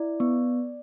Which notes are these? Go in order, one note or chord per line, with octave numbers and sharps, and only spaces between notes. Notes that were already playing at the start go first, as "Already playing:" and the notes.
Already playing: E4 D5
B3